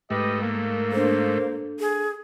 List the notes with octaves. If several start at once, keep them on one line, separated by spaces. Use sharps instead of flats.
G#2 A3 G4 B4 D#5
A#3
D4 A4 C5
G#4